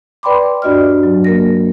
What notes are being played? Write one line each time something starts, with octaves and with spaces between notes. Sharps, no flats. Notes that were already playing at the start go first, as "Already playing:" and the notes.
B4 D5 G5 B5 C6 D6
G2 D4 F#4 D5 D#5 F6
F#3
A#3 A#4 A#6